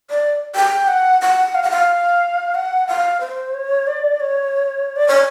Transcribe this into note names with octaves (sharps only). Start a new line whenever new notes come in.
D5
G5
F#5
F#5
F5
F#5
F5
F#5
F5
C5
C#5
D5
C#5
D5
C#5